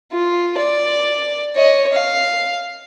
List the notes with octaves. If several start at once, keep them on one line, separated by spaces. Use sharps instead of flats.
F4
D5
C#5 D#5
F5